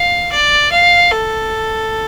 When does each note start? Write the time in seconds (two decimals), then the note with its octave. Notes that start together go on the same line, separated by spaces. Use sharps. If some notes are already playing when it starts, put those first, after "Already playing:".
Already playing: F5
0.32 D5
0.71 F5
1.11 A4